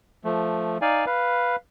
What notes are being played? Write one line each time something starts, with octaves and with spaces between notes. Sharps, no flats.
F3 A3
D#4 D5 F5 G#5
B4 F5